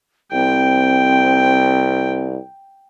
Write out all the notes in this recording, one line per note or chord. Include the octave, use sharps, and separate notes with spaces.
C2 C4 G5